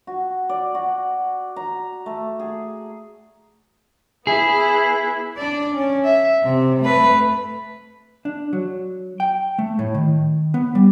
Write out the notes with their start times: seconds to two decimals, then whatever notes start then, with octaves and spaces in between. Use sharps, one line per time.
0.07 F#4
0.49 D5
0.75 F#4
1.56 A#5
2.06 A3
2.39 G#4
4.27 B3 E4 G#4
5.37 D4 D5
5.75 C#4
6.04 E5
6.43 C3
6.81 A3 B4
8.25 D4
8.53 F#3
9.20 G5
9.59 A3
9.79 A2
9.94 D#3
10.54 B3
10.75 G3